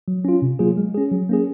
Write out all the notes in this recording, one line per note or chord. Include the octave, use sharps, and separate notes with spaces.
F#3
C#4 F4
C3
F#3 A#3 F4 G#4
G#3
C#4 G#4
F#3
A#3 C#4 G#4